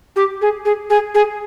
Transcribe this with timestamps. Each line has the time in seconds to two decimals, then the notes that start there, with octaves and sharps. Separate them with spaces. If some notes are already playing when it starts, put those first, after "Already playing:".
0.16 G4
0.41 G#4
0.65 G#4
0.90 G#4
1.15 G#4